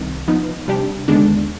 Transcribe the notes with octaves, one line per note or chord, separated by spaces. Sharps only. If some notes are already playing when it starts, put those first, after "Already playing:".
Already playing: C2 C3 D#3
F3 B3 D#4
C3 G3 D4 G4
D#2 D3 G#3 B3 D4